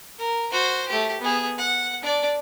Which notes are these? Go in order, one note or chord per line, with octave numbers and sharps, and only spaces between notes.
A#4
F#4 C5
A3 G4
B3 G#4
F#5
D4 D5